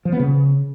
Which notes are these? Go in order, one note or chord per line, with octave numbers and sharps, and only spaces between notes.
F3
B3
C#3